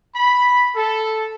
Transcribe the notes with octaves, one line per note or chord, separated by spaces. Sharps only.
B5
A4